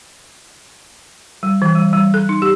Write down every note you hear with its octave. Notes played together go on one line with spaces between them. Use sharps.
G3
E3
G3
G3
A4
D#4
G4